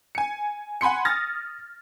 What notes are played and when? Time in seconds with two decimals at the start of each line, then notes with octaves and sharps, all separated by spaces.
0.15 G#5 C#7
0.81 F#5 G#5 B5 C6 C#7
1.05 D#6 F6 A6 A#6